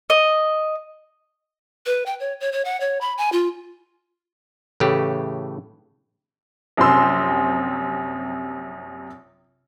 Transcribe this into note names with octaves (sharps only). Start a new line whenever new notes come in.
D#5
B4
G5
C#5
C#5
C#5
F#5
C#5
B5
G#5
F4
A2 C#3 E3 A3 G4
A#1 F#2 C3 C4 C6 E6